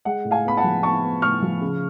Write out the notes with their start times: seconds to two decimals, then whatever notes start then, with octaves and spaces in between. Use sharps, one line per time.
0.05 G#3 F#5
0.25 A2
0.31 F5 G#5
0.45 B3 B5
0.57 F#5 A5
0.64 F3
0.83 B3 A5 C#6
1.03 B3
1.22 A2 C#6 F6
1.42 F3
1.61 C#3